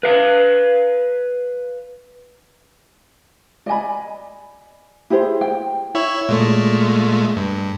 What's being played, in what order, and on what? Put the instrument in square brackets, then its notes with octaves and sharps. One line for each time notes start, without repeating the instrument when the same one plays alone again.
[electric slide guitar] B4 F5
[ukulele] D5 D#5 G#5 B5
E4 G4 G#4 C5
G5
[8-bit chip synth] E4 C#5 E5
A#2 G#3 A3
G2